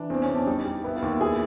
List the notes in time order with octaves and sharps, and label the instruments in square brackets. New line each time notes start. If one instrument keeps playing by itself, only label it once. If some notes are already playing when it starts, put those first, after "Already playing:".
Already playing: [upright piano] E3 [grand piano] D4
[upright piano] E2 [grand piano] C4
[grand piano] C#4
[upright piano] E2
[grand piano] D4
[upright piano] G3 [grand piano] D#4
[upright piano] G3
[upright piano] B3 [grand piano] E4
[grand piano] F4
[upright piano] D#2
[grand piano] E4
[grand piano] E4 [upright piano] G#4